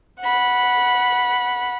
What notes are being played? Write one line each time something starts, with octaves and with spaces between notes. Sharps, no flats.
F#5 B5